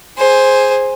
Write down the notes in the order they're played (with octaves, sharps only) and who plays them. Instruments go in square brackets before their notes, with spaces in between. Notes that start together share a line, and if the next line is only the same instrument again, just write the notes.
[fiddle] G#4 C5